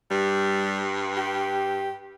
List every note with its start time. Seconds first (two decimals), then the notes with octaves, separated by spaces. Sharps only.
0.11 G2 G3
1.17 G4